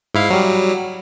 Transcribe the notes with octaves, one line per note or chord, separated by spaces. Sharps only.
G#2 E4 F5
F#3 G3